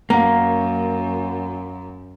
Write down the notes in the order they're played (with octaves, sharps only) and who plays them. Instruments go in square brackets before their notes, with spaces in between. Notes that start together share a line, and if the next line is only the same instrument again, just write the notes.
[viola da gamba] F#2 [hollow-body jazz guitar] A#3 [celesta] F5 F#5 A#5